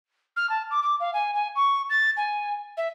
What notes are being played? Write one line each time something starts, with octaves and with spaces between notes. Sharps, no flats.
F6
A5
D6
D6
F5
G#5
G#5
C#6
A6
G#5
E5